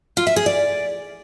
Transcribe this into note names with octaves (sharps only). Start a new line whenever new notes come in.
F4
E5
G#4
D5